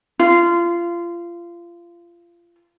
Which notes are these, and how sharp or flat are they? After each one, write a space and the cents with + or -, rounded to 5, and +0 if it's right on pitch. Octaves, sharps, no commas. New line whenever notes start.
F4 -25